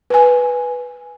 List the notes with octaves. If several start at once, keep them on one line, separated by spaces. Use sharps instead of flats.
B4 G#5